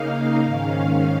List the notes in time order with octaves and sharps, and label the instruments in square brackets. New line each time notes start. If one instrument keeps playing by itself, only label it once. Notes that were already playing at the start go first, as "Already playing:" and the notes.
Already playing: [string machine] C#3 A#3 D#4 F5
G#2 D#3 C#4